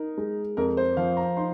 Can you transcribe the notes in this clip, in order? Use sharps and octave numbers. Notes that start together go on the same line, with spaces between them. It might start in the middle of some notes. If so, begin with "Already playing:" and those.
Already playing: D#4 A#4
G#3
F2 A#4
C5
F3 F5
A#5
D#4 C6